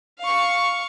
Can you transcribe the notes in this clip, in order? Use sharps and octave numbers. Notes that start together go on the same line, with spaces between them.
F5 C#6